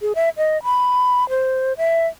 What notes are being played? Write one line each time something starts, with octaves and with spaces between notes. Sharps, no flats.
G#4
E5
D#5
B5
C5
E5